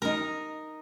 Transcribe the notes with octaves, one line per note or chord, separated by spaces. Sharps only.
D#4 A#4